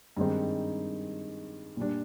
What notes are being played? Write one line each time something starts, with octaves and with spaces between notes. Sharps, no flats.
G2 D#3 G#3 C4 D#4
A#2 G3 D4